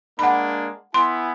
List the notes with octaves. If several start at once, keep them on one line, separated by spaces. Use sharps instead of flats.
G#3 A#3 D4 F#5 B5
B3 E4 G#5 C6